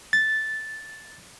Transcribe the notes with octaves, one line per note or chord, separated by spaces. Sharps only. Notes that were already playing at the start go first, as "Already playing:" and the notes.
A6